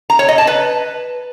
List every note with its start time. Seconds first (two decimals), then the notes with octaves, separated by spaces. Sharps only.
0.10 A#5
0.19 C#5
0.29 D#5
0.38 A5
0.47 B4